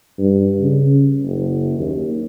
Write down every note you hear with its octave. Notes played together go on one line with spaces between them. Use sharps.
G2
C#3
F#1
D#2